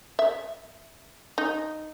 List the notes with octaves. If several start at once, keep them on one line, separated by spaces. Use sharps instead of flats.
E5
D#4